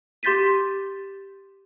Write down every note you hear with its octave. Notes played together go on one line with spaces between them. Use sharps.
G4 C6 G6 A6 B6 D#7